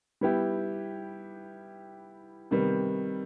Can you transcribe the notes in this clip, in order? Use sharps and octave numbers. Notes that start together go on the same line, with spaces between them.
G3 B3 E4 G4
C3 D#3 G3 B3